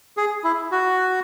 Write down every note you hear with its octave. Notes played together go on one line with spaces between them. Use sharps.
G#4
E4
F#4